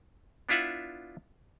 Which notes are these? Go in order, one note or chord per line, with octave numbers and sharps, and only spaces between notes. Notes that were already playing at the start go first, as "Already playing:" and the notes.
B3 D4 E4 F4 E5 F#5